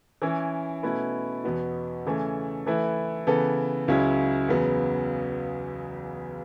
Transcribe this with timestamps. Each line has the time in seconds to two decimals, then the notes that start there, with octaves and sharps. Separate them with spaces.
0.22 E3 C#4 E4
0.83 B2 A3 C#4 E4 B4
1.44 E2 B2 B3 F#4
2.06 C#3 E3 A3 C#4
2.67 E3 A3 E4 B4
3.27 C#3 E3 B3 A4
3.88 C#2 C#3 F#3 C#4 E4
4.48 E2 C#3 F#3 B3